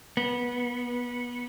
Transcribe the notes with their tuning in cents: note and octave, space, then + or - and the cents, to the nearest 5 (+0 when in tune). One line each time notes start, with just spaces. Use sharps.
B3 -20